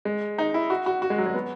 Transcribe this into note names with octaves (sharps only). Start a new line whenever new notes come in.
G#3
D#4
E4
F#4
F#4
F#4
G#3
F#3
G#3
B3